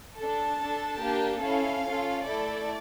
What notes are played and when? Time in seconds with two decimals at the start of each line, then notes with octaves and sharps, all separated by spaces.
0.19 D4 A4 A5
0.60 D4 A4
1.01 A#3 D4 G4
1.42 C#4 E4 A4 F5
1.83 C#4 F4 A4
2.24 A3 E4 A4 D5